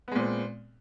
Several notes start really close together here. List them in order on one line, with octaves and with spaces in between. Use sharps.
B3 G#3 A#2 C4